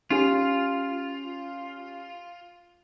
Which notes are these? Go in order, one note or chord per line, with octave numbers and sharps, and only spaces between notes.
C#4 F4 G4